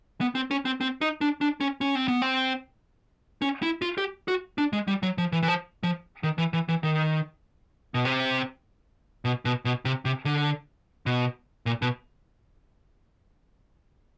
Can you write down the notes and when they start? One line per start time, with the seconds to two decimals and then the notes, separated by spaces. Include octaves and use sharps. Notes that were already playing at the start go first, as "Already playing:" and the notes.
0.21 B3
0.35 C4
0.51 C#4
0.65 C4
0.81 C4
1.01 D#4
1.21 D4
1.41 D4
1.61 C#4
1.81 C#4
1.95 C4
2.08 B3
2.22 C4
3.42 C#4
3.63 E4
3.82 F4
3.98 G4
4.28 F#4
4.58 D4
4.73 G#3
4.88 G3
5.03 F#3
5.18 F3
5.32 E3
5.43 E3
5.48 F3
5.83 F3
6.23 D#3
6.38 E3
6.53 E3
6.69 E3
6.83 D#3
7.94 B2
8.05 C3
9.25 B2
9.45 B2
9.65 B2
9.85 C3
10.05 C3
10.25 D3
11.06 B2
11.66 A#2
11.82 B2